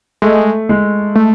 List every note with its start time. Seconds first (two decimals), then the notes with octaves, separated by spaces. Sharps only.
0.22 G#3 A3
0.69 G#3
1.16 A3